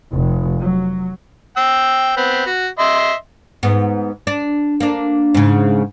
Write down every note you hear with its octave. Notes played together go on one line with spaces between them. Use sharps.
F1
F#3
G5 E6
B3 C4
F#4
D#5 E5 C6
G#2 B3
D4
A#3 D4
G#2 C#3